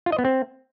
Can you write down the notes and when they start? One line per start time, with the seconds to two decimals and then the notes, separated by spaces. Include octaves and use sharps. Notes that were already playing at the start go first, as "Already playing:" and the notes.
0.06 F4
0.12 D#5
0.19 B3
0.25 C4